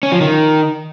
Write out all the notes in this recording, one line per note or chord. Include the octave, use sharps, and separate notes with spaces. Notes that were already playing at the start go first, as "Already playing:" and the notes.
C#4
F3
D#3